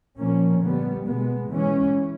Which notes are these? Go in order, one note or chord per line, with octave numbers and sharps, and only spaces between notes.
A#2 F3 A#3 C#4
D3 G3 B3
B2 G#3 B3
E3 G#3 C#4